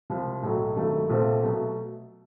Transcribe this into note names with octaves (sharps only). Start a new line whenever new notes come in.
C2 C3 F3
B1 A2 F#3 A3
G#1 G2 D#3 F#3 A3
A#1 A#2 F3 A3 C4
B2 F#3 A3